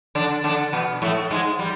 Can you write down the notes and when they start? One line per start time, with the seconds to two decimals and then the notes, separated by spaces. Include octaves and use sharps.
0.15 D3 D4
0.44 D3 D4
0.72 B2 B3
1.02 A2 A3
1.31 G#2 G#3
1.59 G3